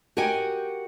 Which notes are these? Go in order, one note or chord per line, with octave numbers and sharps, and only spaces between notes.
F#4 G4 A#4 D#5 G5 G#5